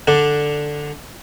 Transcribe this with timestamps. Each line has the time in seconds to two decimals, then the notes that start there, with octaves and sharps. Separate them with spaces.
0.07 D3 D4